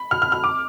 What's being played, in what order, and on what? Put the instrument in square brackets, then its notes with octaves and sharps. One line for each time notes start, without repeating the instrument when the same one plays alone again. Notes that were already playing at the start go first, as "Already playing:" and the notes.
Already playing: [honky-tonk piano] B5
F6
F6
F6
D6